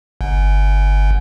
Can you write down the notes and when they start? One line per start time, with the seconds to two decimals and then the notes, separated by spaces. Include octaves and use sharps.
0.21 G1